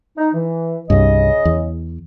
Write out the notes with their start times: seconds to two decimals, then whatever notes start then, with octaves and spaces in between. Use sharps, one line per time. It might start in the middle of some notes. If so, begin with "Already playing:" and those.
0.18 D#4
0.34 E3
0.90 C2 G2 C#3 D#5
1.45 E2